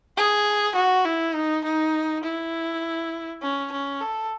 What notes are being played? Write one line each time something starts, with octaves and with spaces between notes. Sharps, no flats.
G#4
F#4
E4
D#4
D#4
E4
C#4
C#4
A4